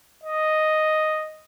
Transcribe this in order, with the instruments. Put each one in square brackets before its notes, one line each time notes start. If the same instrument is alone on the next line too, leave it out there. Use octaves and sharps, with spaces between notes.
[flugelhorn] D#5